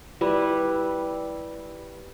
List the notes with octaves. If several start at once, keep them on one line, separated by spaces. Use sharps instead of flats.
G3 E4 B4